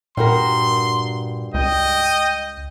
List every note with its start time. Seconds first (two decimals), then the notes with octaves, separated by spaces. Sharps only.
0.17 G2 A#2 F#4 A#4 C6
1.54 C#2 D#5 G5